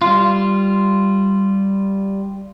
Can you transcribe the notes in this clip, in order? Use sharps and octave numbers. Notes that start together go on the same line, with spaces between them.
G3 F4